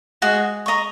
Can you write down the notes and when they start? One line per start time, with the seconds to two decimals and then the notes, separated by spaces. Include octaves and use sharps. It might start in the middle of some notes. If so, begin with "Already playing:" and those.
0.22 G#3 F#4
0.66 D#5 A#5 C#6